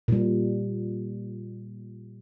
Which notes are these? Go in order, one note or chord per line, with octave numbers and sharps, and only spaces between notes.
A#2 G3